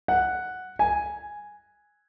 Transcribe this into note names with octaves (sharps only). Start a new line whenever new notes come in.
F#5
G#5